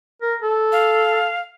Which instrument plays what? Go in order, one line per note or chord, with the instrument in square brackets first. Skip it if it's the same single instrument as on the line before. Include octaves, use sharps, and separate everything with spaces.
[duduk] A#4
A4
[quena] F5